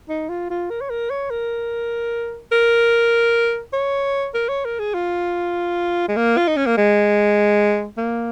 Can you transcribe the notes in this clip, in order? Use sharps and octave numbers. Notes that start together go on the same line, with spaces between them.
D#4
F4
F4
A#4
C#5
A#4
C#5
A#4
A#4
C#5
A#4
C#5
A#4
G#4
F4
G#3
A#3
F4
D#4
C#4
A#3
G#3
A#3